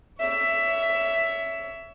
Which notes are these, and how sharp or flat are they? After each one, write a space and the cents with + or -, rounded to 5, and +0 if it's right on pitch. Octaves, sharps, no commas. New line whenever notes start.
C#5 +30 E5 +10